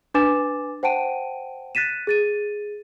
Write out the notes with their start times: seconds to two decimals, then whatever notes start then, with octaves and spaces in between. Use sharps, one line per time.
0.14 D4 B4 G#5 D6 A6 E7
0.83 C5 F#5 G5 A5 D7 D#7
1.75 F#6 A6 B6 D#7 E7
2.07 G#4 A6 D#7